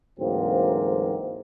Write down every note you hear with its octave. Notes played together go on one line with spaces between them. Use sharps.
D2 G#2 E3 F#3 A#3 C4